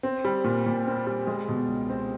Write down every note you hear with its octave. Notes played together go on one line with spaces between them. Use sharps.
C4
G3
A#2
A#2
C4
G3
G#3
B2
C#2
C4